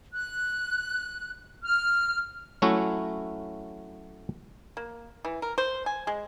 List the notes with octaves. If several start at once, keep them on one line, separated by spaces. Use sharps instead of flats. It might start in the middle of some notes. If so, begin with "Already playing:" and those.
F#6
F6
F#3 A3 C#4 E4 F#4
A#3
E3
A#4
C5
G#5
G#3